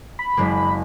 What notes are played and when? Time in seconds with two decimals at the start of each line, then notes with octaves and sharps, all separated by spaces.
0.19 B5
0.37 F#1 G#3 A#3